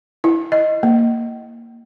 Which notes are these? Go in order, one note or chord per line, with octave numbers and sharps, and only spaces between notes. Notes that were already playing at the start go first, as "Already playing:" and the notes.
E4
D#5
A#3